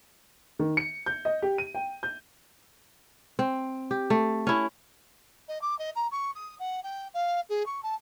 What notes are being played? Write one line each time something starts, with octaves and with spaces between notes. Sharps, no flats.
D#3
C#7
G6
D#5
G4
D#7
G5
G6
C4
G4
A3
C#4 E4
D#5
D6
D#5
A#5
C#6
D#6
F#5
G5
F5
G#4
C#6
A5